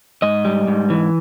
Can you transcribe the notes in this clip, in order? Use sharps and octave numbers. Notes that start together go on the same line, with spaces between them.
G#2 D#5
G3
G#2
E3